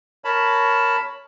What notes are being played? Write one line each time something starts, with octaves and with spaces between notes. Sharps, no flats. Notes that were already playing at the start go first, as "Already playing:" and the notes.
A#4 C#5 A5 B5